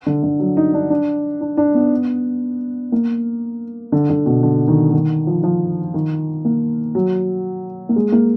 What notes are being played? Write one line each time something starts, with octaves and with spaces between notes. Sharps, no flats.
D3
D3
F#3
D#4
D4
D4
D4
D4
B3
A#3
D3
D3
B2
D3
D#3
D#3
F3
F3
D#3
A#3
F#3
A#3
G#3
A#3